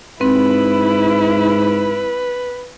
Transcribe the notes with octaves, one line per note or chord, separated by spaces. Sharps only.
G#2 C4 E4 B4